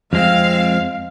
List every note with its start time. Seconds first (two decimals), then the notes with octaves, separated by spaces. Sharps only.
0.13 F2 G#3 C4 F5